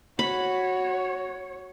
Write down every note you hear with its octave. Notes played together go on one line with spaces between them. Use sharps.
F#4 C#5 B5